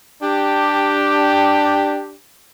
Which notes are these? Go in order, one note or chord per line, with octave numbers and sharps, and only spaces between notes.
D4 G4